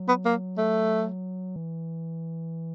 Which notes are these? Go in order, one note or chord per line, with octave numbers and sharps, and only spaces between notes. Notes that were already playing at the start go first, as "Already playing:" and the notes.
Already playing: F#3
B3
A#3
A3
E3